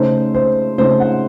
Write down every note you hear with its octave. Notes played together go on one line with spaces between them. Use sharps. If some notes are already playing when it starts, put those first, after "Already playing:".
Already playing: C#3 A3 D#4 C5
C5
C#3 A3 D#4 C5
F#5